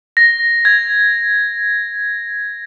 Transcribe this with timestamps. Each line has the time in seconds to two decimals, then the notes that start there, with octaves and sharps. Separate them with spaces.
0.17 A#6
0.65 G#6